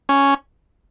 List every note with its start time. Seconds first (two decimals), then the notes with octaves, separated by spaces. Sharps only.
0.09 C#4